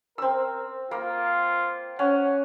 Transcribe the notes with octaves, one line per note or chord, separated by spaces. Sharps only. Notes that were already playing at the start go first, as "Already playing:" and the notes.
C4 A#4 E6
A#3 F4
C#4 F#5